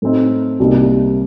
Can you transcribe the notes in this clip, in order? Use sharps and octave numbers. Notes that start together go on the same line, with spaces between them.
A2 A3 C4 D#4
C2 C3 G3 A#3 D#4